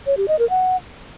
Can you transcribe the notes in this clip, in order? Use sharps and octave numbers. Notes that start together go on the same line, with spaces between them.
C#5
G4
D#5
A#4
F#5